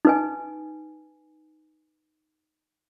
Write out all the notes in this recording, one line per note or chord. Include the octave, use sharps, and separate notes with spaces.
D#4 B4 G#5